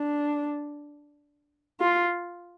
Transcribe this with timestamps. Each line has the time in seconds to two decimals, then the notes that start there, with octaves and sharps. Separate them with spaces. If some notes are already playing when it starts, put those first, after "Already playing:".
Already playing: D4
1.80 F4